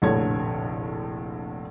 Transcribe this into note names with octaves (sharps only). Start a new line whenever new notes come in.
F1 A#1 A2 D3 C#5 G#6